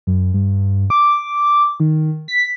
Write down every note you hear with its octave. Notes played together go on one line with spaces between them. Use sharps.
F#2
G2
D6
D#3
B6